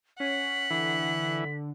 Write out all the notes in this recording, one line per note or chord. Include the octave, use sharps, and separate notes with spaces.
C#4 F#5 B6
D3 E3